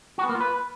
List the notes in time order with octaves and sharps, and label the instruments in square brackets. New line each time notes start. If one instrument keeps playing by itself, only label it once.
[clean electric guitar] F#4
B3
A#3
F4
B4